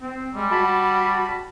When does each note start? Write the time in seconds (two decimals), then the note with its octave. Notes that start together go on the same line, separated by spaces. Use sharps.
0.01 C4
0.34 G3 G#3
0.51 F#4 A5 B5